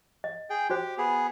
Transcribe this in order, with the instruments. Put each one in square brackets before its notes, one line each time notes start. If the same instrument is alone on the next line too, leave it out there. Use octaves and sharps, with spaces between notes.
[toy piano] D#5
[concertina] G#4 G5
[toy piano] F#4 C5 [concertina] G4
[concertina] B3 G#4